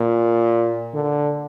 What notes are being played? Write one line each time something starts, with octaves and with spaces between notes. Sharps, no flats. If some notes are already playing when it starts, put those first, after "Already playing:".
Already playing: A#2
D3